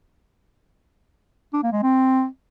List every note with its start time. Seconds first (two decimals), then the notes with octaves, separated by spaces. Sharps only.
1.53 D4
1.63 A#3
1.73 G#3
1.82 C4